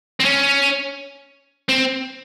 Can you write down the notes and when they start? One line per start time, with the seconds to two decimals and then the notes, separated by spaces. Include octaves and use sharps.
0.20 C4
0.25 C#4
1.69 C4